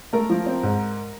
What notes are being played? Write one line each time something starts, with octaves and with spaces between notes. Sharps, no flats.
A3 A#4 A#5
F3
C4
G#2